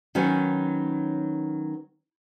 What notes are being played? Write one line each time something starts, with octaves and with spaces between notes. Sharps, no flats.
D#3 F#3 B3 C#4